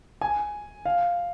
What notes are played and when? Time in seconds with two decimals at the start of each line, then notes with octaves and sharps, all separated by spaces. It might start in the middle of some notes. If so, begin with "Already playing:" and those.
0.21 G#5
0.85 F5